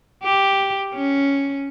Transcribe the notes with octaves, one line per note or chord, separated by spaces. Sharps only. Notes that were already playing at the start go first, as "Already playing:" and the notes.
G4
C#4